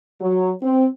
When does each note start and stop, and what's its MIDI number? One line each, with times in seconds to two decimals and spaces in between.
0.21 0.51 54
0.63 0.86 60